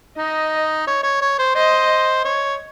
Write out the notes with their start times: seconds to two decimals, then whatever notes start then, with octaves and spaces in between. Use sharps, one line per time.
0.18 D#4 D#5
0.87 C#5
1.03 C#5
1.22 C#5
1.39 C5
1.55 C5 D#5
2.25 C#5